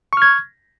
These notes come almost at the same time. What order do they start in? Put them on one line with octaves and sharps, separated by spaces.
C#6 F6 G#6